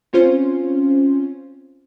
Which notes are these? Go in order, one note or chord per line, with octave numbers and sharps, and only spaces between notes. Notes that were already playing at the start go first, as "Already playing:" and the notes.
C4 C#4 F4 C5